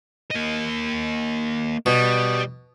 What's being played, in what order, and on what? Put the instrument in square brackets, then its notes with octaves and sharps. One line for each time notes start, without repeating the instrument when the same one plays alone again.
[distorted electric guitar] A#3 D#5
[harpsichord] B2 [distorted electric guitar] G3